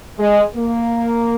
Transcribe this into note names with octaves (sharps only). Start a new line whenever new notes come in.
G#3
A#3